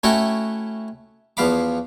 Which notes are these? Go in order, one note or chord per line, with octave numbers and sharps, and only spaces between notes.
A3 C#4 E4 F#4 C#5 G5
E2 F3 B3 F5 B5 D6